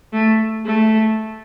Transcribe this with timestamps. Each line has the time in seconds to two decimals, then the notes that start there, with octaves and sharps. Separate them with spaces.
0.13 A3
0.66 A3